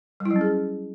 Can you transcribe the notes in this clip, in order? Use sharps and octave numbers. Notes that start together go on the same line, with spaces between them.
G3
E4
F#3
C#4
G#4